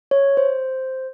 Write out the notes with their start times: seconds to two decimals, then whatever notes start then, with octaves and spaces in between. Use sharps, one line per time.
0.11 C#5
0.37 C5